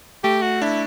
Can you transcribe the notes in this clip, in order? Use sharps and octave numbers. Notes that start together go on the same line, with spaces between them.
A3 G4
F#4
D4 E4